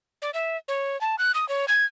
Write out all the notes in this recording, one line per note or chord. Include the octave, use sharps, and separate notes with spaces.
D5
E5
C#5
A5
F#6
D#6
C#5
G#6